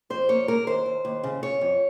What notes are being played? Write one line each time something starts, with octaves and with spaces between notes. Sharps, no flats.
F2 C5
A#3 C#5
A#3 A#4
D#2 C5
D#2
D#2
C#3
C#3 C#5
F2